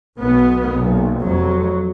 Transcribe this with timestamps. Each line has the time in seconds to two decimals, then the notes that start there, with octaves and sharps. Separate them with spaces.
0.20 B1 B2 B3
0.71 B1 A#2
1.21 F1 F2 F#3